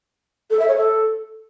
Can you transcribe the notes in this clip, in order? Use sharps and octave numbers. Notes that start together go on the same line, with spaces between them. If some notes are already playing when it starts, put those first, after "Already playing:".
A4
E5
C#5
A4